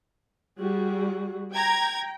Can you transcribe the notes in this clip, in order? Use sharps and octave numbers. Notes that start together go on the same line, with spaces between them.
G3 F#4 G#4
G5 A#5 G#6